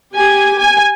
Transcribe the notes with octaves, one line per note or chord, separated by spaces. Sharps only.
G4 G#5
G#5